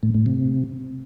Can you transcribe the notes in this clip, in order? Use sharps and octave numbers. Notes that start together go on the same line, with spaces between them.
A2
A2
C3